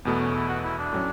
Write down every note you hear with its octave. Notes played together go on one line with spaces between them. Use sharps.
E2 B2 A3 B3
C#4
E4
F#4
E4
D4
A2 F#3 C#4